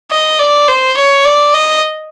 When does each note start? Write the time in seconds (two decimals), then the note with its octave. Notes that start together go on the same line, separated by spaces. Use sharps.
0.11 D#5
0.39 D5
0.68 C5
0.96 C#5
1.25 D5
1.53 D#5